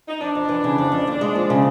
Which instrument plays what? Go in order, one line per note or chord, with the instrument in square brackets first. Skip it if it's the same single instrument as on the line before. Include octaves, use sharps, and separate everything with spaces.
[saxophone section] D#4
[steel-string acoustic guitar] F2 [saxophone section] D4
[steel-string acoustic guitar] F2
E3
C#3
F2
F2
D#2
G#3
F3
C#3